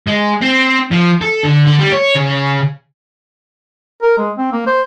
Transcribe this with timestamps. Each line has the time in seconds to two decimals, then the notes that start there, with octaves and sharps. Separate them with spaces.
0.08 G#3
0.42 C4
0.92 F3
1.21 A4
1.43 D3
1.66 D3
1.79 G3
1.92 C#5
2.15 C#3
4.02 A#4
4.18 G#3
4.38 C4
4.52 A#3
4.67 C5